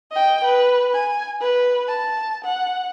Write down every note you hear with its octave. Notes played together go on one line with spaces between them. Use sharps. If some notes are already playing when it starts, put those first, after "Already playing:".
D#5 G5
B4
G#5
B4
A5
F#5